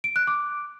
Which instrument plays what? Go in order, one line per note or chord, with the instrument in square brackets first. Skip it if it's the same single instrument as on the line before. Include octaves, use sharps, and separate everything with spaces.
[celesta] D7
F#6
D6